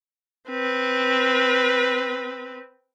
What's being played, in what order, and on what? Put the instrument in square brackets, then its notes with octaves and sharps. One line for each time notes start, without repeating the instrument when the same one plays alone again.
[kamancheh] C4 B4